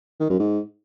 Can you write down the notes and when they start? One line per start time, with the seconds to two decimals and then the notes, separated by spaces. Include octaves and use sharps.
0.20 D#3
0.30 F#2
0.39 G#2